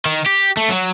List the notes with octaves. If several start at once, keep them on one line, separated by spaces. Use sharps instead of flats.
D#3
G4
A3
F#3